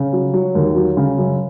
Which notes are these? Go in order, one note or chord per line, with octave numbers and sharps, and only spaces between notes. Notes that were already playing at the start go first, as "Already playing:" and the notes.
Already playing: C#3
F#3
F#3
D#2
F#3
C#3
F#2